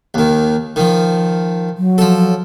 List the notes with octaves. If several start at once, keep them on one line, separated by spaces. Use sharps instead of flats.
D#2 D#3
D#3 F3
F#3
F3 A4